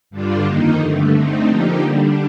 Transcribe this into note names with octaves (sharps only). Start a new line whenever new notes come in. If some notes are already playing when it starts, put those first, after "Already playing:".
G2 D3 G3 D4 F4
F2 D#3 A#3 D#4
G2 D3 A3
D3 A3 C4 D#4
D3 F3 A#3 D#4 G4
D3 G3 D4